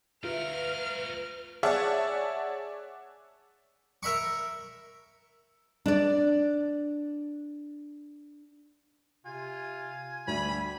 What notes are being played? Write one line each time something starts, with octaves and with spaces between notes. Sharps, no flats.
A3 F4 A#4 B4 E5 F6
G#4 C#5 D5 E5 F#5 A5
A#4 E5 B5 C#6
D4 D5
C3 F4 G#5
D2 G3 B5